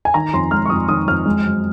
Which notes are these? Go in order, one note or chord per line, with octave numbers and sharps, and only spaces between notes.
G#5
D#3 A#5
F2 C6
G#3 F6
C#6
F2 D#6
D#3 D#6
F2 F6
G#3
F#2